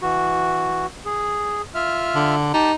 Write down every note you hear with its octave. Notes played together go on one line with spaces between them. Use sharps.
E3 F#4
G#4
F4 E5 F6
D3
D#4 G4 A5